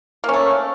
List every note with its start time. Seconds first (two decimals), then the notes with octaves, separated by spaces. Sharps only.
0.24 A#3
0.29 C#4
0.33 A3